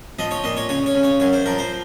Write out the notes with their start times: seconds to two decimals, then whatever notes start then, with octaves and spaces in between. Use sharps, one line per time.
0.19 F3 D#5
0.31 C#5
0.44 A#2 D#5
0.57 C#5
0.69 C#3 C#5
0.86 C#5
0.95 C#3
1.03 C#5
1.20 F#2 C#5
1.33 C5
1.46 F3 A#4
1.58 C5